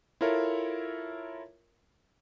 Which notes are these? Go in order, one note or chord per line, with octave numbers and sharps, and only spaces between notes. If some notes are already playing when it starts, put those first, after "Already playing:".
E4 F4 A4 A#4 C#5 E5